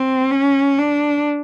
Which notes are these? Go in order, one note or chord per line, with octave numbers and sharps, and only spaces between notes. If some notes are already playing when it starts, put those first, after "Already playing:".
Already playing: C4
C#4
D4